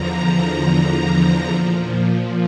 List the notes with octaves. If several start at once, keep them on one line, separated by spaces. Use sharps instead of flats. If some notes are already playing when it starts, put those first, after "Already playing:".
Already playing: E2 D3 F3 A#5
A#5
A#5
A#2 F3